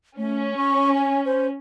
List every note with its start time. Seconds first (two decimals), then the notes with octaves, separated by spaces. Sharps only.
0.18 A3 C#4
0.57 C#6
0.94 G#5
1.25 C5